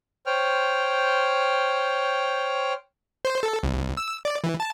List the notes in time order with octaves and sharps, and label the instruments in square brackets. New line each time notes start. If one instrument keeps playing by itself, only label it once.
[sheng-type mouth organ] C5 C#5 G5 F6
[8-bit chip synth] C5
A4
C2
C2
E6
D5
E3
A5